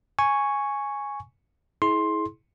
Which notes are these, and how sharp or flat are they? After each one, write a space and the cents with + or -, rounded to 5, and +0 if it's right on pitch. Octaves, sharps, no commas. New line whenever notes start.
G#5 +0 C#6 +0
E4 -25 G#4 +35 C6 +10